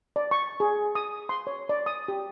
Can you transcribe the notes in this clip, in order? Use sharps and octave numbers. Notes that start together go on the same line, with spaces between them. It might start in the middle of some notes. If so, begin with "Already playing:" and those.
D5
C#6
G#4
D#6
C6
C#5
D5
D#6
G4